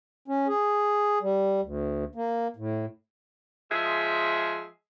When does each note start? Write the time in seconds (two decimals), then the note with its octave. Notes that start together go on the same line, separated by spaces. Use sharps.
0.28 C#4
0.48 G#4
1.22 G3
1.62 D2
2.15 A#3
2.56 A2
3.71 F3 G#3 G#4 E5